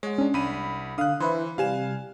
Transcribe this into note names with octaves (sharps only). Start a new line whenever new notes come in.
G#3 C#5 F#5
C#4 D4
C2 B5 D#7
D3 F5 D#6 F#6
E3 E4 B4 C5
C3 G3 F5 G#5 E7